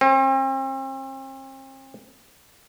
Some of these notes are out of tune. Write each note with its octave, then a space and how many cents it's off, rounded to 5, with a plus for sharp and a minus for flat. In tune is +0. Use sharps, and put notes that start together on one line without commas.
C4 +40